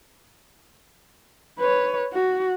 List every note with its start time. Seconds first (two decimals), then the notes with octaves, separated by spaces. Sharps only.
1.59 B4 C#5
2.14 F#4